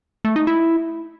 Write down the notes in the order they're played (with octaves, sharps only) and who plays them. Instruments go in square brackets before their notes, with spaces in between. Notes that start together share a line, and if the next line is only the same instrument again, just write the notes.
[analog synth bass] A3
D#4
E4